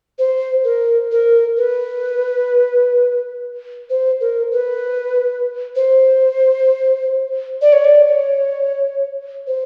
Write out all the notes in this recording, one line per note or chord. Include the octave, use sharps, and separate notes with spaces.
C5
A#4
A#4
B4
C5
A#4
B4
C5
D5
C#5
D5
C#5
C5